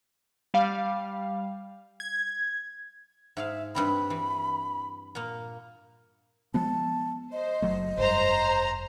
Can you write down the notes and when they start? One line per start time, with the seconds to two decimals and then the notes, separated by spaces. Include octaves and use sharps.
0.54 G3 F5
2.00 G#6
3.37 G#2 G#4 E5 F5
3.75 G2 G3 C4 B5
4.10 E3
5.15 A#2 A#3
6.54 F3 G#3 B3 A5
7.32 C5 D#5
7.62 F#1 F#3 A3
7.97 F1 G2 C5 A#5